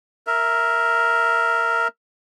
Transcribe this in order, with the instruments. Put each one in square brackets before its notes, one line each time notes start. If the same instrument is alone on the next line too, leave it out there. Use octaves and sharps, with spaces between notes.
[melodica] A#4 E5